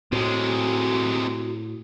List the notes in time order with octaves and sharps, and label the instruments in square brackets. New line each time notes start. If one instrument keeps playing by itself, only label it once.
[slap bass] A2 [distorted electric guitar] C3 G#3 [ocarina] F#4